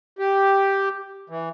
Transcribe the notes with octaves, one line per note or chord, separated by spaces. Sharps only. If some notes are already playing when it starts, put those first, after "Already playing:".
G4
E3